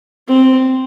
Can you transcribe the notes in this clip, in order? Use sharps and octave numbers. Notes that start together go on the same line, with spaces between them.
C4